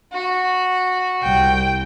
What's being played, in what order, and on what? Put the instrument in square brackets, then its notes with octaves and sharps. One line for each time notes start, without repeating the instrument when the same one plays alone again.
[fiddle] F#4
[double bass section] C2 [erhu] G5